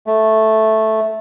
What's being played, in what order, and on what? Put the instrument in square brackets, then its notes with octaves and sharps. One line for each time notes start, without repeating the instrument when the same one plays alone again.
[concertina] A3